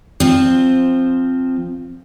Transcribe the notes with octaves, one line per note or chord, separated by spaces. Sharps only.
F3 C4